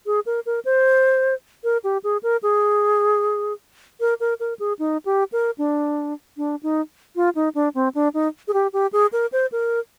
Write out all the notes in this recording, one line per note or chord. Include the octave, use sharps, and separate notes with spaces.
G#4
A#4
A#4
C5
A#4
G4
G#4
A#4
G#4
A#4
A#4
A#4
G#4
D#4
G4
A#4
D4
D4
D#4
F4
D#4
D4
C4
D4
D#4
G#4
G4
G4
G#4
A#4
C5
A#4